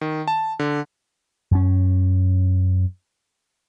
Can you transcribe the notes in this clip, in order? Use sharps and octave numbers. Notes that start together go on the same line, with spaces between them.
D#3
A5
D3
F#2 C#4